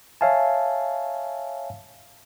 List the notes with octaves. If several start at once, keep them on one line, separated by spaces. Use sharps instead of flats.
C#5 E5 F5 G#5 A5